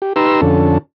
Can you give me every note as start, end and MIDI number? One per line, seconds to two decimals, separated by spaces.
0.02 0.13 67
0.16 0.41 63
0.16 0.41 67
0.16 0.41 71
0.16 0.41 82
0.16 0.41 84
0.16 0.41 88
0.42 0.78 41
0.42 0.78 50
0.42 0.78 61
0.42 0.78 69